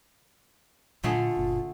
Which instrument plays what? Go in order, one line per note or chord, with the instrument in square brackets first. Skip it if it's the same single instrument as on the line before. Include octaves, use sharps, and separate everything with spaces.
[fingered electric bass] A#2 F#3 [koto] D3 A3 G#4 [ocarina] F4
[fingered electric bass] F#1 A#2